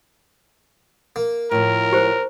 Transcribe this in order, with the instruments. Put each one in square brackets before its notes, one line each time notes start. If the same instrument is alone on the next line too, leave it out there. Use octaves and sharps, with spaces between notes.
[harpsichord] A#3
[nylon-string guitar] A2 F3 [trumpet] A#4
[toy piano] G4 C5